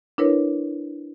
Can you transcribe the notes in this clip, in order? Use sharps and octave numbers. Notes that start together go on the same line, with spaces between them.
D4 E4 A#4 B4 C#5